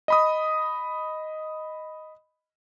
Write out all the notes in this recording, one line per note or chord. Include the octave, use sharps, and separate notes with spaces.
D#5 B5 D#6